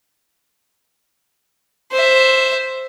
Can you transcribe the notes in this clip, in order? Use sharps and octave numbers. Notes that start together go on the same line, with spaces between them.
C5 E5